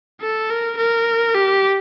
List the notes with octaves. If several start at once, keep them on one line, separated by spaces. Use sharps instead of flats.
A4
A#4
A#4
G4